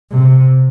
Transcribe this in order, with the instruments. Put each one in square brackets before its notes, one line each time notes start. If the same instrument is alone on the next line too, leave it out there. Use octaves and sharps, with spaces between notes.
[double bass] C3